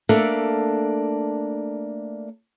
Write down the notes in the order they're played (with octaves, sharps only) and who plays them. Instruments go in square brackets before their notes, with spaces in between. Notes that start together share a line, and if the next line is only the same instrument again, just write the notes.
[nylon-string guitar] A3 A#3 D4 A4 E5 F5